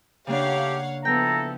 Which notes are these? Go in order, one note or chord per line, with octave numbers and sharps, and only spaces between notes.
C#3 A3 A#3 D4 G4 C#5 F5 F#5
F3 B3 E4 A4 G5 A#5